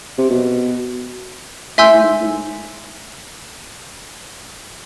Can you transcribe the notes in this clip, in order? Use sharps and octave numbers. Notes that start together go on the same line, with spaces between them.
C3
B2
A2 E5 G#5 C6 E6 G6
A2
G#2
A2
G#2